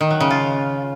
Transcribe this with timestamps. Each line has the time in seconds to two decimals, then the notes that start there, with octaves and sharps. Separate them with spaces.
0.01 D#3
0.11 F#3
0.20 C#3
0.30 F4